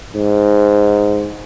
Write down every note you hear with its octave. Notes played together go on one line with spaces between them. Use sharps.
G#2